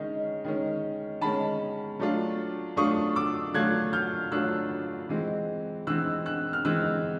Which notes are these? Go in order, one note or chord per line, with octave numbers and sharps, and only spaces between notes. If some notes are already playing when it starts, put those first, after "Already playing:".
Already playing: D#3 G#3 C#4 D#5
D#3 G#3 C#4
D#3 G#3 C#4 A5 B5
F#3 A3 D4 F4
F#3 A3 D4 F4 C#6 D#6
D6 E6
F#3 A3 D4 F4 F#6 G#6
F6 G6
F#3 A3 D4 F4 E6 F#6
E3 G#3 C4
E3 G#3 C4 E6 F#6
E6 F#6
F6
E3 G#3 C4 E6 F#6